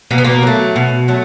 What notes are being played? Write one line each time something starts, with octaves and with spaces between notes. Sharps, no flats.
B2 A#3
B3
A#3
F#3 A3
B2
F#3 A3